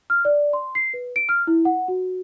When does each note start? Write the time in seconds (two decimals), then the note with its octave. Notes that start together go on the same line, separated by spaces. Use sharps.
0.10 F6
0.25 D5
0.53 C6
0.75 C7
0.94 B4
1.16 D7
1.29 F6
1.47 E4
1.65 F#5
1.88 F#4